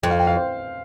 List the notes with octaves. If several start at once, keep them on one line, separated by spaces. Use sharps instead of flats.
F2 G5
F5
G5
F5
C5